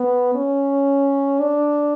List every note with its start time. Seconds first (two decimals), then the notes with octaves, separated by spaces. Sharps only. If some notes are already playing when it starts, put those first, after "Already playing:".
Already playing: B3
0.35 C#4
1.39 D4